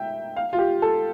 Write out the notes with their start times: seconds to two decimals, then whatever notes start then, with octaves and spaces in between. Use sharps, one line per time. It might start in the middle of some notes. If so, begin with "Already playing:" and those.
Already playing: E5 G5
0.36 F5
0.53 F4
0.58 G4
0.82 A4